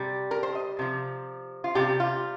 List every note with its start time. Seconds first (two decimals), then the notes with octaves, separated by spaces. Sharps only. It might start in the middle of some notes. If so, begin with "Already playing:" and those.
Already playing: C3 G3
0.31 A#4
0.43 C5
0.55 D#5
0.79 C3 F3
1.64 F4
1.75 C3 G3 G4
2.00 F4